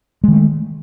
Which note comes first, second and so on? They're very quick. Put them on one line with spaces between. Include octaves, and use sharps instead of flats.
G#3 D#3 A3